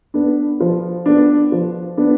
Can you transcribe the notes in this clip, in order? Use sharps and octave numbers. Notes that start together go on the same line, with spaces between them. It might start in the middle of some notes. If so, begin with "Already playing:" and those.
B3 D4
F3
B3 D4
F3
B3 D4